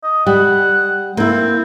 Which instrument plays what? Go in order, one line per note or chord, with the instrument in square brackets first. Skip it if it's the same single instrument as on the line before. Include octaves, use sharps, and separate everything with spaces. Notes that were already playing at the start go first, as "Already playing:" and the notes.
[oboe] D#5
[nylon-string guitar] G3 [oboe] F#5
[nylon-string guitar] A#3 E4 [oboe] C4